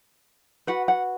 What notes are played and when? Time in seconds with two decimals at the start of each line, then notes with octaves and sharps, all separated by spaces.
0.67 F#4 B4 F#5
0.88 F#5